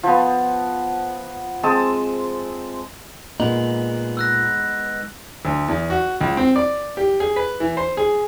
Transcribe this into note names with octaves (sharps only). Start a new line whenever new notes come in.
F3 B3
G#3 C4 A5 D#6
A#2 G#3 B3 D#4 F#7
E6 F#6 A#6
D2
E2
F#4
C#2
C4
D5
G4
G#4
B4
E3
C5
G#4